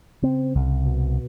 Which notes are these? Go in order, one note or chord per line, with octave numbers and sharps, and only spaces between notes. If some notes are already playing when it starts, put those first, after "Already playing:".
C#3 C4
C2
B2